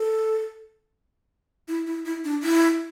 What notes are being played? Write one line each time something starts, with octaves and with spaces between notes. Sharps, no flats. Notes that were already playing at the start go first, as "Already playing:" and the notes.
Already playing: A4
E4
E4
E4
D4
E4